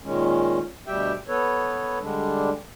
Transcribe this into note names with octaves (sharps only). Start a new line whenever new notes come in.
A#2 D#3 G#3 C#4
D2 B2 G3 G4 E5 G5
B3 A4 B4 C#5
D3 G3 G#3 D4